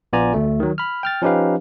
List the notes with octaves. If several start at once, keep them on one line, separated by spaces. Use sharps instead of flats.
A#1 B3 F4 D5 G#5 A#5
D2 A3
D#3 F#3
B5 F6
G5 F6 A6
F3 C#4 D#4 G4 B4 F5